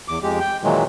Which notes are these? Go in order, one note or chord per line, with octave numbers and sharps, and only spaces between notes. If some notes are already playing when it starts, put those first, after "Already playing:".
E2 D6
F2 G#3 G4
G5
A#2 D#3 E3 F#3 G#3